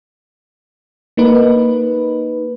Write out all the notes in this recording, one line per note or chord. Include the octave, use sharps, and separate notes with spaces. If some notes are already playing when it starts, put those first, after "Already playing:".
A#3 D#4 B4